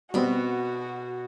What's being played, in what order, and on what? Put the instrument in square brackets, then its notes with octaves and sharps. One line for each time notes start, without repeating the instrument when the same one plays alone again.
[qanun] B2 B5 [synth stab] G3 B3 C4 [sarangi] F#4